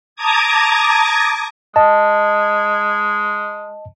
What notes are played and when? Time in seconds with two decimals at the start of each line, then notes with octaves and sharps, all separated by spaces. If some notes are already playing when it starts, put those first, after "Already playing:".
0.16 A5 A#5 D6 D#6 G#6
1.76 G#3 D#5 A5